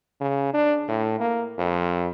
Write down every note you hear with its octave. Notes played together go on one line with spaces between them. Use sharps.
C#3
D4
A2
A#3
F2